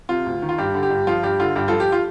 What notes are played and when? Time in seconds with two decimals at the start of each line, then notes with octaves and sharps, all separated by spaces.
0.09 C3 F4
0.26 D2
0.42 D#3
0.49 F4
0.58 G2 G4
0.74 D3
0.83 G4
0.90 G2
1.07 F3 F4
1.23 G2 G4
1.39 D3 F4
1.56 G2 G4
1.68 F3 F4 A4
1.80 G4
1.92 F4